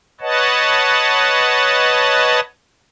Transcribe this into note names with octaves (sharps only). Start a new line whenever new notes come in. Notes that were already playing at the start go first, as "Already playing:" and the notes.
B4 C#5 D#5 F#5 A5